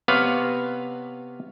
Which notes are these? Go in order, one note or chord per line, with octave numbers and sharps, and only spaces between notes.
C3 B3 B4 C#5 F5